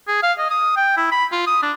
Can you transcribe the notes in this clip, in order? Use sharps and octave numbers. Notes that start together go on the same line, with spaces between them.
G#4
F5
D#5
D#6
G5
E4
B5
F4
D#6
D4